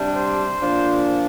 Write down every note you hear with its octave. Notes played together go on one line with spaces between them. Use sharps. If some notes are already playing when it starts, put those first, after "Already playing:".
Already playing: C3 G3 D4
C5
A#2 F3 D4